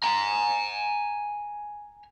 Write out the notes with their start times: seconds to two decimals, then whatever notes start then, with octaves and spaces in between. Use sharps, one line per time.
0.04 G#5 A#5